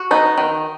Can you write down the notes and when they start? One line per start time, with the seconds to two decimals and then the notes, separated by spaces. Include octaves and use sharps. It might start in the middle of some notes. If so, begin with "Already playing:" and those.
Already playing: F#4
0.11 B3 D#4
0.38 D#3